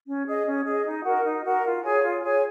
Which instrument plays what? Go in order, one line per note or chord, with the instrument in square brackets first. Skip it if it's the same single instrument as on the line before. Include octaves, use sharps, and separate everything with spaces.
[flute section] C#4
G#4 D#5
C#4
G#4 D#5
D#4
F#4 A#4
D#4
F#4 A#4
F4
G#4 C#5 G#5
F4
G#4 C#5 G#5